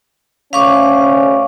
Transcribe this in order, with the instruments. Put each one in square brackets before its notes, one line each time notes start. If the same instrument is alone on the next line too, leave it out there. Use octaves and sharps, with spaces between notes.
[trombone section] D2 C#4 [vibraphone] F5 C#6 D6